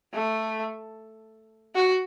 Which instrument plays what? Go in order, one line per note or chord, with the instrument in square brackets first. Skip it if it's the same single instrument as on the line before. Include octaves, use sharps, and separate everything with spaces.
[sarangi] A3
F#4